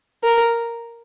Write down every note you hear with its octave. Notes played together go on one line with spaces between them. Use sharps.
A#4